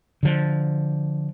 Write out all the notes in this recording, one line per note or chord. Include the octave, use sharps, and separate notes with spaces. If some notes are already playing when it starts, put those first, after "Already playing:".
D3 F3